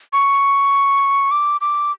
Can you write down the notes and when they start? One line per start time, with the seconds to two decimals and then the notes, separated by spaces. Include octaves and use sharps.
0.13 C#6
1.31 D6
1.61 D6